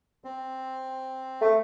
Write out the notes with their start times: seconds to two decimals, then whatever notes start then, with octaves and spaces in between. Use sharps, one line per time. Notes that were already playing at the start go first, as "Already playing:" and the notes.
0.24 C4
1.41 A3